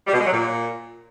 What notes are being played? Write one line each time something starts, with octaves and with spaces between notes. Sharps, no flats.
G3
B2
G#3
F#3
A#2